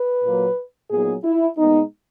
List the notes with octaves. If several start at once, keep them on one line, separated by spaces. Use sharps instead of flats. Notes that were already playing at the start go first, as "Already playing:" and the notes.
Already playing: B4
A#2 F#3 A#3
A#2 F#3 B3 D#4 G#4
E4
A#2 G#3 B3 D#4